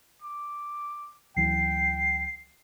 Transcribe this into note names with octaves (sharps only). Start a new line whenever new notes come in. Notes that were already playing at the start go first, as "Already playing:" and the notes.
D6
D2 E3 F#3 G5 C7